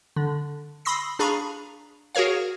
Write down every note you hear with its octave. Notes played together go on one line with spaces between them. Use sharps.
D3
B5 C6 D#6 E6 A#6 C7
D4 G#4 F5 A#5 B5 C#6
F#4 G#4 A#4 C#5 F5